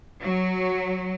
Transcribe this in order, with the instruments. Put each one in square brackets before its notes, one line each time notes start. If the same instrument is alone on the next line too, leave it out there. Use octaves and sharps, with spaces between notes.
[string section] F#3